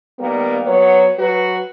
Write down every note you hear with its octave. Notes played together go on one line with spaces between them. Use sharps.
D#3 G3 A#3 B3 A#4
F#3 B3 C#5
F#3 F#4 B4